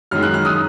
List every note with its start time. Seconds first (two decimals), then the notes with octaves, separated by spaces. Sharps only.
0.11 F#2 D#3 G#3 F6
0.23 F#6
0.34 F6
0.45 D#6